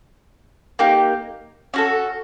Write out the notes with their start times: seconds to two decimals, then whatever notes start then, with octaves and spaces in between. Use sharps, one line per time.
0.79 A#3 D#4 G4
1.74 C#4 F#4 A4